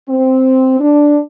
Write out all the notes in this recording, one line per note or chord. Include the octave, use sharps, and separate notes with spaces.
C4
D4